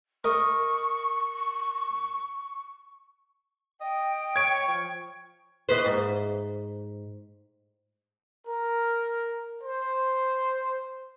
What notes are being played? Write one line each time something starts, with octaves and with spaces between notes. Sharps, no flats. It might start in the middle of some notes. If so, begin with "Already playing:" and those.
A#4 D#5 C#6
D#5 G5
C#5 C#6 G#6 D7
F3
D#4 B4 C5
G#2
A#4
C5